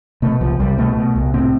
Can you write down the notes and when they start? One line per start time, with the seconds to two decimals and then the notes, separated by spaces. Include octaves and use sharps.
0.22 B2 A3
0.41 C2 F3
0.60 C2 G3
0.78 B2 A3
0.97 B2
1.15 C2
1.34 A2 C4